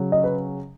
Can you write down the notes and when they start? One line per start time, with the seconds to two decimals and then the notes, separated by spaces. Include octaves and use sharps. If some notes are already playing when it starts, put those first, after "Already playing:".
Already playing: C#3 F#3 C#4
0.12 D#5
0.24 B4